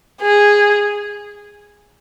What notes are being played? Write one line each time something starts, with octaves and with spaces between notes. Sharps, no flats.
G#4